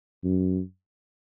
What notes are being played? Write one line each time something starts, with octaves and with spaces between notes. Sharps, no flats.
F#2